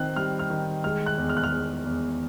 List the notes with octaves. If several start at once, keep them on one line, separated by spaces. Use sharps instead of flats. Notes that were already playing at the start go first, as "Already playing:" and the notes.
Already playing: D#3 C4 F#6
G3 F6
F6
D#3
G#3 F6
F#6
E2
F6
F#6
F6
E2
E2